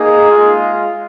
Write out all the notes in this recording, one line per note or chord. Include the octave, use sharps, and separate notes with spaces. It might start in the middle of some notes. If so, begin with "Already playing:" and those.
Already playing: A#3 D#4 G#4
G#3 F4